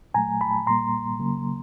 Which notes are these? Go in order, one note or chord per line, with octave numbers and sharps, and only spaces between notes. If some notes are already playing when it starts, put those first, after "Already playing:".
A#2 F#3 A3 G#5 A#5
A5 B5
A#2 G3 A#3 A#5 C6
C#3 F#3 A#3